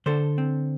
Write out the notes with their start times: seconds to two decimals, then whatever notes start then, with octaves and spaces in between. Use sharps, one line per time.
0.06 D3 A4 C5
0.38 C4